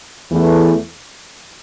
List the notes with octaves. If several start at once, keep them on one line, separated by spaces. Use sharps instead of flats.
E2 E3 A3